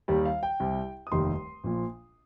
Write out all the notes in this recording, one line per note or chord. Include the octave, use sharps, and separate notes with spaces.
D#2 D#3 G3
F5
G5
C2 C3 G3
D#6
F1 D#2 D#3 G3 C6
A#1 A#2 F3